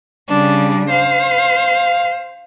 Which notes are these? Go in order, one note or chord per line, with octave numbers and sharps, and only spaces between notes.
C#3 G3 D4
C5 F5